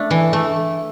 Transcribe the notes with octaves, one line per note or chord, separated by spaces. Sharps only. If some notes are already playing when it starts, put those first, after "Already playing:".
Already playing: A3 D4
E3
A3